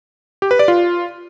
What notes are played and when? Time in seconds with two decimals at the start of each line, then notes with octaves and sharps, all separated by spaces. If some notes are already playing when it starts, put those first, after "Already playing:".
0.42 G4
0.51 B4
0.59 D5
0.68 F4